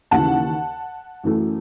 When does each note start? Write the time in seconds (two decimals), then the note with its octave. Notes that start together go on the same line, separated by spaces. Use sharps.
0.11 D#2 C#3 E3 F#5 A5
1.24 F#2 E3 A3